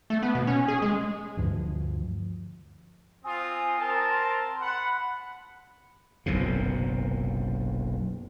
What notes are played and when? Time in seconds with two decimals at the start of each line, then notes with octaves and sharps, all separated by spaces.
0.10 A3
0.23 B3
0.35 B2
0.47 C#4
0.68 G#4
0.82 G#3
1.37 D2 G2 F3
3.24 C4 F4 G#5 D#6
3.77 C4 A#4 A5
4.10 C6
4.61 F#5 B5
6.26 F#1 B1 F#2 C3